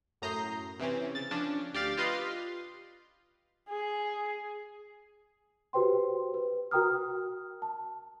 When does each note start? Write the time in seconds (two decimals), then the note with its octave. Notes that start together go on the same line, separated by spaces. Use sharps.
0.22 F#2 A2 A#5 D#6 G6 C7
0.80 C3 E3 C4 C#4
1.15 C#3 A6
1.31 F3 C#4 D4
1.73 D2 G4 D5 F5 A6
1.97 F4 G4 B4 D#5 F5 C6
3.69 G#4
5.73 F#4 G4 B4 C5 G5 C6
6.34 B4
6.71 F#4 A#4 G5 A#5 D#6 F6
7.62 A5